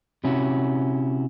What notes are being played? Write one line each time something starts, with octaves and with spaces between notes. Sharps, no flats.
C3 C#4 E4 F#4